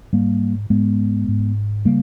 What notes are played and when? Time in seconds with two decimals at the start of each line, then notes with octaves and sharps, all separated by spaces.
0.13 G#2 G3 A#3
0.70 G#2 G#3 B3
1.28 G#2
1.85 C#3 G3 A#3